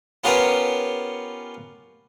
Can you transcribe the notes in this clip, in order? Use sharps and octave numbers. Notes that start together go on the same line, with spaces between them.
B3 C#4 F4 G4 A#4 B4